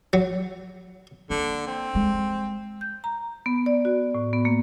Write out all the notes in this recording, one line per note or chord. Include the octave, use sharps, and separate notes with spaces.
F#3
D3 A#3
C4
G#3
G6
A#5
B3
D5
F#4
A2
B3
A#3